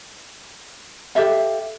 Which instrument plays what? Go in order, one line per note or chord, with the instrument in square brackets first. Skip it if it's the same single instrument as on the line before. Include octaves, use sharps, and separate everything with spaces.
[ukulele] G4 A4 E5 F5